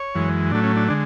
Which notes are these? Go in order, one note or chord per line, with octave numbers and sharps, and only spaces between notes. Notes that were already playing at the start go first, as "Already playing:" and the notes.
Already playing: C#5
F#2 E3 G#3
A2 F#3 A3 D4
C#4
D4
D3 G#3 D4